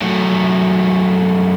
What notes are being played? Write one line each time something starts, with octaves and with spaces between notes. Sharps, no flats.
F#2 A3